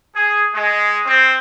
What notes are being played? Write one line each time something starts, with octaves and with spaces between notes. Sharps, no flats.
G#4
G#3
C4